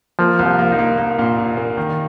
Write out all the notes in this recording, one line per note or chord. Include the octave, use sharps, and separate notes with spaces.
F3 A#3
C2
F3
A#3
D#4
A#3
A#3
A#2
A#2
A#3
D#3